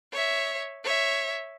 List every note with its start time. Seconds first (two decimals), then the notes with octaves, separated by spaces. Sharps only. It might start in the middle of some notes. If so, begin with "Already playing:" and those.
0.13 C#5 E5
0.84 C#5 E5